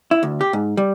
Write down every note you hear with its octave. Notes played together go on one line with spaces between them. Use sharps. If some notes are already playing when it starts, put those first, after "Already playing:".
E4
D2
G4
G#2
G3